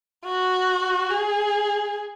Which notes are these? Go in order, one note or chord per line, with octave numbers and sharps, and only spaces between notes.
F#4
G#4